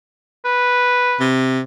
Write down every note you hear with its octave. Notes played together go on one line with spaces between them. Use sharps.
B4
C3